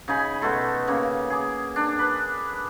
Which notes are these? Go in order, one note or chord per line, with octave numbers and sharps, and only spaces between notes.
C#3 D#4 G#5 B5
B2 A3 A4 C6
C#3 A#3
G#4 D6
D4
B4